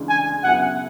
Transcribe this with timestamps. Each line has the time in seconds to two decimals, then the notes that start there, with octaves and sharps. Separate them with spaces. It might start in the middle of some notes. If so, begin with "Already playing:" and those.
Already playing: D2 C#3 E3 G#3 D4
0.09 G#5
0.43 F#2 C#3 F#3 B3 E4 F#5